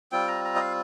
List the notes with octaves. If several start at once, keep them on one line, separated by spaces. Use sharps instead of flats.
G3 C4 F4 G5
A#5
A#5
D#5
F5